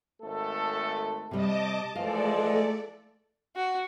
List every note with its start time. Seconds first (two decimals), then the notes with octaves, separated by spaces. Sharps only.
0.21 G#1 A3 A4
1.31 C3 G3 D#5 A5 D6
1.96 E3 F3 G#3 A3 A4 D5 F5
3.56 F#4